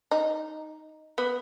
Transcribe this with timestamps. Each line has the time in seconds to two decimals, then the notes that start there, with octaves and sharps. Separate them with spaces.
0.11 D#4
1.18 B3